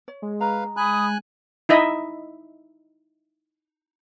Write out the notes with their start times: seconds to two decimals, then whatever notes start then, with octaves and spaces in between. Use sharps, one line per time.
0.08 C#5
0.22 G#3
0.41 B4 F5 A#5
0.77 G#5 B5 D#6 F#6
1.69 D#4 E4 D#5 E5